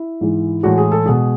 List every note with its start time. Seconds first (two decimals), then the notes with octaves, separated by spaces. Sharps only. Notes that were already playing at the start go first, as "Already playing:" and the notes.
Already playing: E4
0.21 G#2 E3 G#3
0.63 A2 E3 G#3 F#4
0.78 G#4
0.92 A4
1.06 B2 G#3 G#4